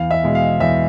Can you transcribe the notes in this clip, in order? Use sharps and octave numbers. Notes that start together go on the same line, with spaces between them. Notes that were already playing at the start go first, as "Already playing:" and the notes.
Already playing: E2 F5
E5
B2 G#3
F5
E2 E5